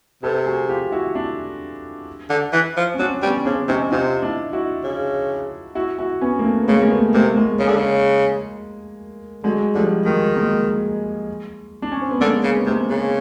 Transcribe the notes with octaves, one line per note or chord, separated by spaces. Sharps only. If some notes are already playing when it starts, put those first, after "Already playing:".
C3 A4 B4
F#4 G#4
F4 G4
E4 F#4
D4 E4
D3
E3
F3
C#4
F#3 C4 D4
G3 B3 C#4
C#3 C4 D4
C3 C#4 D#4
C3 D#4 F4
D4 E4
E4 F#4
C#3
E4 F#4
E4 F#4
B3 C#4
A#3
A3 B3
B3
C#3 G#3 A#3
A#3
A3 B3
C3 G#3 A#3
G#3 A#3
C#3
D3
C#3
D3 F#3 G#3
D3 F3 G3
D#3 F#3 G#3
G#3 A#3
D4
C#4
C4
B3
D3 G#3 A#3
C#3
B3
C3 A#3 C4
C#3